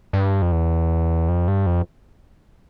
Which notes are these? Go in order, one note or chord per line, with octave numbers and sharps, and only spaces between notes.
G2
F2
E2
F2
G2
F2